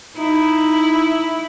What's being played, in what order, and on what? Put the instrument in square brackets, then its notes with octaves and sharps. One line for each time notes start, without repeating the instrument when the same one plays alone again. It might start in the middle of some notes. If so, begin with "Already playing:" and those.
[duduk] D#4 [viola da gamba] E4